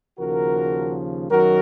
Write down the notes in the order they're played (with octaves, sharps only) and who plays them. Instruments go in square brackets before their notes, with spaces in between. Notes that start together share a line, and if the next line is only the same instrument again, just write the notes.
[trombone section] D#2 C#3 F3 F#4 A#4
F#2 D#3 F#3 F#4 A#4